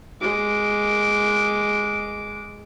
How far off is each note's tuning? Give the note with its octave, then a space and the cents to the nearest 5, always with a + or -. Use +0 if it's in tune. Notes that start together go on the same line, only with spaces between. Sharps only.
G#3 +0 D6 -10